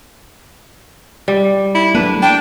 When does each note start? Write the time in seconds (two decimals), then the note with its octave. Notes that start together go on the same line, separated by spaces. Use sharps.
1.28 G3
1.75 E4
1.95 F#3 A3 A#3 D4 B4
2.22 D4 G5